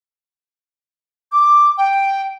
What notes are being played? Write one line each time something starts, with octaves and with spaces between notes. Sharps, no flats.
D6
G5